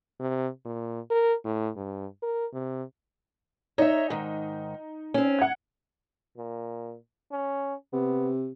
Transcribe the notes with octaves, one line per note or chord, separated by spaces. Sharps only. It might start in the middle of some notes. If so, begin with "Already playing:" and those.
C3
A#2
A#4
A2
G2
A#4
C3
D#4 C#5 E5
G#2 D#3
C4 C#4
F#5 G#6
A#2
C#4
C3 B3